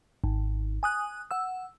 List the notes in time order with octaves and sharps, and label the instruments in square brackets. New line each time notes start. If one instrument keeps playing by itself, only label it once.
[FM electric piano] G#1
G#5 D#6 F#6
F#5 E6